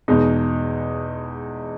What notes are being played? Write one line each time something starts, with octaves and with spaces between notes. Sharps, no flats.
E2 B2 G#3 D#4